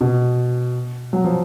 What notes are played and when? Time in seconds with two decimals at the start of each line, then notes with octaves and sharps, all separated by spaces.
0.01 B2
1.13 F#3
1.24 F3